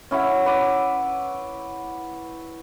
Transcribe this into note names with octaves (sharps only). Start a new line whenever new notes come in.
C#4 E4 E5 F#5
B4 D5